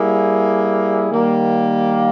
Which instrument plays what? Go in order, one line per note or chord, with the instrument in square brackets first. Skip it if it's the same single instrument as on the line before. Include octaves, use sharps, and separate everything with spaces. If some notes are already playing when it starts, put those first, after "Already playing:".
Already playing: [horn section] G3 A#3 E4 G#4
D#3 G3 A#3